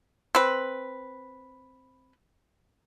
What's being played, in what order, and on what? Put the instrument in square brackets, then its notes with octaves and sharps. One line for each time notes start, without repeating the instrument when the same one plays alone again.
[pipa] C4 B4